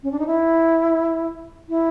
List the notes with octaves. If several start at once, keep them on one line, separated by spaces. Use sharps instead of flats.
C#4
D4
D#4
E4
E4